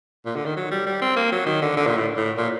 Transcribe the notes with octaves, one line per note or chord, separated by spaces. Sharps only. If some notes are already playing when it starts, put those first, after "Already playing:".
A#2
D3
D#3
F#3
G3
G3
C4
A#3
F#3
D#3
D3
D3
A#2
A2
A2
A#2